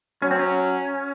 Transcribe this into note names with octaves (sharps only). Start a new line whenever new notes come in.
F#3 C#4
C4
C#4